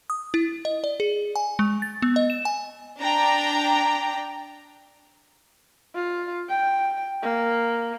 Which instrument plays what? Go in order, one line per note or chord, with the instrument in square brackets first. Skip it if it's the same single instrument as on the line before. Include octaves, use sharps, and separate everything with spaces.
[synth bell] D#6
E4
D#5
D5
G#4
G#5
G#3
A6
B3
D#5
E7
G#5
[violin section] D4 G5 A#5
[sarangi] F4
G5
A#3